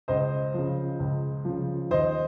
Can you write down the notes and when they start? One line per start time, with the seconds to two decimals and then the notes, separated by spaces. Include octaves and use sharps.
0.08 C#2 C5 D#5
0.54 C#3 F3
1.00 C#2
1.45 C#3 F3
1.91 D#2 C5 D#5